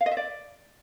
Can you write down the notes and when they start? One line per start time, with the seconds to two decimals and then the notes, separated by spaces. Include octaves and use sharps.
0.01 F5
0.06 D#5
0.11 E5
0.17 D5